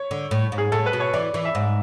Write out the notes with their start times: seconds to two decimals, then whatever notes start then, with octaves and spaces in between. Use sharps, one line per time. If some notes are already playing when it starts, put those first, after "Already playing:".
Already playing: C#5
0.11 D3
0.31 A2
0.52 G#2
0.58 G#4
0.72 A2 A4
0.86 B4
0.93 B2
1.00 C#5
1.14 E3 D5
1.34 E3
1.45 E5
1.55 G#2